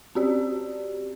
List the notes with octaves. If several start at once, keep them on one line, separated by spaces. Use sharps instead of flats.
C4 C#4 F#4 G4 D5